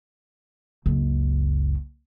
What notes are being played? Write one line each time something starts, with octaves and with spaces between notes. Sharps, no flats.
F#1 C#2